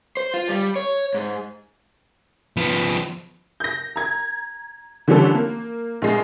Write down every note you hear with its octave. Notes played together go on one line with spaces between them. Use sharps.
C5
F4
G3
C#5
G#2
F3 B3
G6 A#6
A#5 G#6
D3 E3 F3 G3 C#4 A4
A#3
A#1 G#3